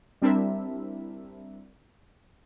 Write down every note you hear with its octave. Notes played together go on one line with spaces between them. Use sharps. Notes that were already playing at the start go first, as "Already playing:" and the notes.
G3 C4 D4 E4 A#4 E5